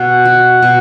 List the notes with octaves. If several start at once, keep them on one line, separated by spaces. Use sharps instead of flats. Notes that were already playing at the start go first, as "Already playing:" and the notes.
Already playing: B2 F#5
F#4
B2